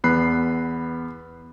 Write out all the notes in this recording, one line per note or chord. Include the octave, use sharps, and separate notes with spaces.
E2 B3 B5 F#6 C7